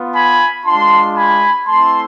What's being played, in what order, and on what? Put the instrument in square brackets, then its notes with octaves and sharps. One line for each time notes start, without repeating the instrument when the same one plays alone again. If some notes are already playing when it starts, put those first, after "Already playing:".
Already playing: [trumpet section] B3 F4
G#5 B5
G#3 D4 F4 A5 C6
G#5 B5
A3 C4 E4 A5 C6